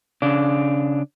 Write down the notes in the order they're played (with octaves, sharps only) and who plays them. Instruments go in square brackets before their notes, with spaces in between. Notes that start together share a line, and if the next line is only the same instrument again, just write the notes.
[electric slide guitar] C#3 D4